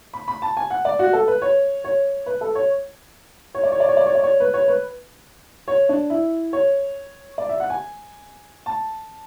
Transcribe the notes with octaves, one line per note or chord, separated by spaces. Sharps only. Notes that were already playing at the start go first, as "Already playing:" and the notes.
B5
B5
A5
G#5
F#5
D5
F#4
A4
B4
C#5
C#5
B4
A4
C#5
C#5
D5
C#5
D5
C#5
D5
C#5
D5
C#5
B4
C#5
B4
C#5
D4
E4
C#5
D5
E5
F#5
G#5
A5